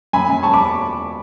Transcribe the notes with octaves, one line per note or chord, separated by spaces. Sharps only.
F#2 G#5 B5
F#2
E1 A5 C#6
B5 D6